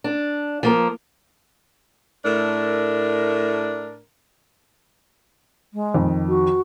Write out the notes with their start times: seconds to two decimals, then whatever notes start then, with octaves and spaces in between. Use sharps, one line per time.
0.04 D4
0.63 F3 A#3 A#4
2.25 A2 A3 D4 A#4
5.74 G#3
5.94 F2 D#3
6.28 F#4